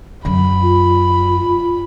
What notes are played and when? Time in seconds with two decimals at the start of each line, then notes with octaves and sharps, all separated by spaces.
0.25 F#2 C#3 B5
0.62 F4